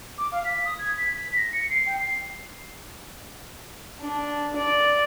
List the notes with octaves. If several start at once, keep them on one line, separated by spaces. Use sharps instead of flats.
D6
F5
B6
D#6
G#6
B6
B6
A#6
C#7
C7
G5
C7
D4
D5